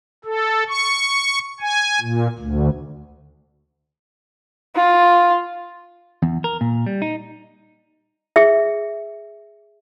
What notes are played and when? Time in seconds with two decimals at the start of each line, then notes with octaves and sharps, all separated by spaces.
0.25 A4
0.69 C#6
1.61 G#5
2.01 A#2
2.39 D2
4.75 F4
6.23 E2
6.44 A#4
6.61 A#2
6.86 G3
7.02 D#4
8.36 G#4 E5